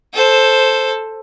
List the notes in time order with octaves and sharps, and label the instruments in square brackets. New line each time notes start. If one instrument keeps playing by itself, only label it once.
[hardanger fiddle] A4 C5